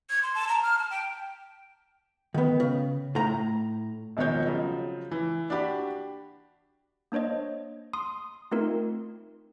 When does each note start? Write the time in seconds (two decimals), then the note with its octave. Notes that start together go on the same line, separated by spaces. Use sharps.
0.10 G#6
0.23 C6
0.35 A5
0.49 A#5
0.63 F6
0.78 A5
0.90 G5
2.34 D#3 B3
2.60 C#3
3.15 A2 A#5
4.17 E1 B2 D#3 F3 C#5 G6
4.46 C#3 F3 F#3
5.11 E3
5.50 D4 F#4 G4 B5
7.12 A#3 D4 C5 C#5 D#5
7.93 C6 D#6
8.52 A3 C4 D#4 F4 A#4